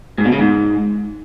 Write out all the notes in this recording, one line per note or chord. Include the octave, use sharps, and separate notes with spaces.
G#2
B2
C#3
G#2